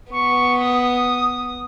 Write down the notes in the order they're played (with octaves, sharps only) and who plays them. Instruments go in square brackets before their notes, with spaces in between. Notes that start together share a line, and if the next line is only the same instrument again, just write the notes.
[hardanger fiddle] B3 [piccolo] C#6
[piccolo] D#6